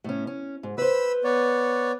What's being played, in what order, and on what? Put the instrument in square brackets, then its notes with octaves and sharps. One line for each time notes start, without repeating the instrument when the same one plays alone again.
[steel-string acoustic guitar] A2 C#4
C#4
G#2
[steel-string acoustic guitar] B4 C5 [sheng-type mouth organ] B5 E6
[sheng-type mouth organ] B3 C#5 D5